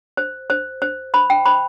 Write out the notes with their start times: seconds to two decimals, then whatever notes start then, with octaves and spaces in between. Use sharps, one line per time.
0.17 C5
0.50 C5
0.82 C5
1.14 C5 B5
1.30 G5
1.46 C5 B5